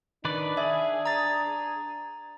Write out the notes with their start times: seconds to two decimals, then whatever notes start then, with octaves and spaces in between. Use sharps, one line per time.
0.25 D#3 D4 B4 D5
0.57 G#4 E5
1.06 A#5 A6